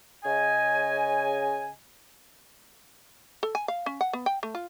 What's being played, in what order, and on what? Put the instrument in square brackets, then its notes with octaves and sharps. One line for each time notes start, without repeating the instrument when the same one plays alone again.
[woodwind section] C#3 D#5 G#5
[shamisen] A4
G#5
F5
C#4
F#5
B3
G5
A3
F4